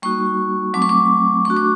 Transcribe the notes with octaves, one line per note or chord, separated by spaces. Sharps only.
G3 A#3 D#4 F#4 C#6
F#3 A3 C4 D6
C#6
D6
A3 D4 F#4 C#6
D6